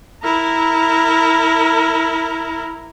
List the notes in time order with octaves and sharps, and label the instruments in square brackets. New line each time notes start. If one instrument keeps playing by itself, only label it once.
[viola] E4 A#4